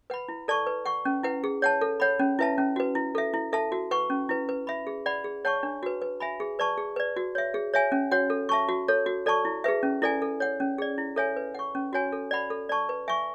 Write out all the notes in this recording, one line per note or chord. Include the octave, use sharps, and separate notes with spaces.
B4 F#5 B5
E4
A4 D5 A5 C#6
B4
F#5 C#6
C#4
E4 B4 F#5
G#4
C#5 F#5 A5
A4
C#5 F#5 B5
C#4
E4 B4 E5 A5
C#4
F#4 B4
E4
A4 E5
E4
A4 E5 A5
F#4
B4 F#5 C#6
C#4
E4 B4
B4
E5 B5
G#4
D5 F#5 B5
G#4
C#5 F#5 A5 C#6
D4
F#4 B4
B4
E5 G#5 B5
G#4
B4 D5 A5 C#6
G#4
B4 D5
F#4
C#5 E5
G#4
C#5 E5 G#5
C#4
F#4 C#5 F#5
A4
E5 A5 C#6
F#4
A4 C#5
F#4
A4 D5 A5 C#6
E4
G#4 B4 E5
C#4
E4 A4 D5 G#5
A4
C#5 F#5
C#4
G#4 D5
E4
A4 C#5 E5 G#5
B4
F#5 C#6
C#4
F#4 C#5 G#5
A4
D5 F#5 B5
A4
D5 A5 C#6
B4
E5 G#5 C#6